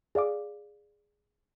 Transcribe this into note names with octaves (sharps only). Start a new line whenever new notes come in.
G#4 D5 F5 D6